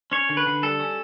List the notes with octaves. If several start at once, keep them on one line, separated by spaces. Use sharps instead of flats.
C#4 C#5
D3
B4
D3
G3 A4
C#4